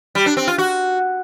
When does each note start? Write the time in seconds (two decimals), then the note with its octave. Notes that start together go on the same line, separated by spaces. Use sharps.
0.15 G3
0.26 D4
0.37 C4
0.48 F4
0.58 F#4